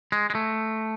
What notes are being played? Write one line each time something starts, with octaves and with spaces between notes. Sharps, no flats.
G#3
G#3
A3